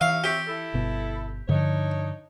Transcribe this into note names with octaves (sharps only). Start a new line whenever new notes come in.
D#2 E3 C#5 E5 F5
C4 G4 C#5 E5
E4 A4
G1 B2
G2 D3 F3 D4 D#4 C#5